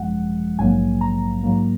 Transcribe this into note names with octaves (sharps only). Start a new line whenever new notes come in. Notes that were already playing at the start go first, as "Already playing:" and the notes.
Already playing: G#1 F#2 F3 G#3 F#5
A#1 G#2 F#3 A#3 G#5
A#5
G#2 F#3 A#3